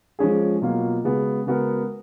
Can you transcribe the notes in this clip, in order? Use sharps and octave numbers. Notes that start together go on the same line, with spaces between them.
F3 G#3 C#4 G#4
B2 F#3 A#3 F4
C#3 G#3 B3 F#4
C#3 G#3 B3 F#4 A#4